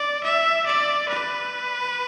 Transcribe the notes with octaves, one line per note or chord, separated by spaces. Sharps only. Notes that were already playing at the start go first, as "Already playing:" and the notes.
Already playing: D5
E5
D5
B4